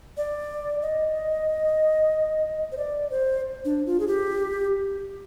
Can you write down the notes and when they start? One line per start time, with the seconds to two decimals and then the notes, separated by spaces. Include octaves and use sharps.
0.17 D5
0.82 D#5
2.72 C5
2.77 D5
3.11 C5
3.65 D4
3.86 F4
4.00 G#4
4.08 G4